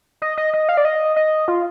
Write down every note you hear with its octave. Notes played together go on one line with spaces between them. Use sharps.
D#5
D#5
D#5
F5
D5
D#5
D#5
F4